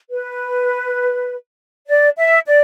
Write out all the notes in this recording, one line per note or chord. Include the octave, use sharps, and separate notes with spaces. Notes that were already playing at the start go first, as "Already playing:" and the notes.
B4
D5
E5
D5